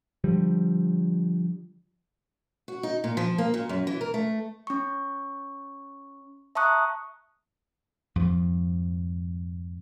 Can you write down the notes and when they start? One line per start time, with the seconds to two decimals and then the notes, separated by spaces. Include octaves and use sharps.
0.24 D3 F3 G3
2.68 F#4
2.83 D#4
3.04 A#2
3.17 F3
3.38 A#3
3.54 A#2
3.69 F#2
3.87 E3
4.01 A#4
4.14 A3
4.67 C#4 C#6
6.55 E5 A5 A#5 C#6 D#6 F#6
8.16 F2 G#2 F3